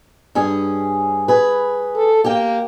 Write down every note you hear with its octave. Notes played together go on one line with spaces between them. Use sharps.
G2 C#4 G#4
G#4 B4
A4
A#3 G4 G5